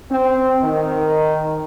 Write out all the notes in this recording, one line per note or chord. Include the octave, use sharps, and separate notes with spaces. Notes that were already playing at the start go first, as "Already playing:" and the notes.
C4
D#3